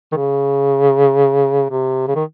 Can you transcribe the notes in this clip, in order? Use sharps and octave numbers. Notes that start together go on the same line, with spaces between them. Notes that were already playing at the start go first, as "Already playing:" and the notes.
D#3
C#3
C3
C#3
D#3